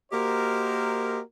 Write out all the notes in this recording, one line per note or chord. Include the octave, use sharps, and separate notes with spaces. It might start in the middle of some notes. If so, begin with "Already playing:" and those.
A#3 F#4 G4 A#4 C5 D#5